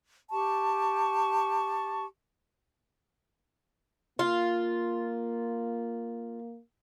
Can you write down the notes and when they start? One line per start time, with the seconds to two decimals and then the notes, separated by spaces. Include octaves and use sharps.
0.31 G4 A5 C#6
4.19 A#3 F4